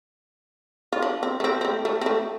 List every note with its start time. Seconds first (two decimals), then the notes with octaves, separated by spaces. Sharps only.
0.93 F4
1.02 D4
1.23 C4
1.40 A3
1.44 C4
1.61 C4
1.65 A3
1.85 A3
2.01 C4
2.06 A3